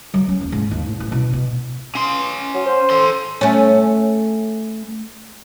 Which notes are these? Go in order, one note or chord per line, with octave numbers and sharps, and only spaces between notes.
F#3
C#4
D#2
G#2
D#2
A2
A1
B2
B2
C#4 C6
F#3
C5
A4 C6
A3 C#4